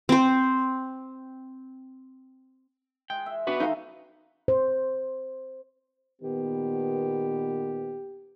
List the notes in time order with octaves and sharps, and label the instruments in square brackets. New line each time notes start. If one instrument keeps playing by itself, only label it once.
[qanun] C4 C5
[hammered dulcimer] G#3 [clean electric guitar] G5
[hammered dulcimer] E5
[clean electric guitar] B3 F#4 B4 [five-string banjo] D4
[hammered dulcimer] E3 G#3 [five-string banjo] D#4 A4 F5
[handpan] C5
[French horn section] A#2 D#3 B3 [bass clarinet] G4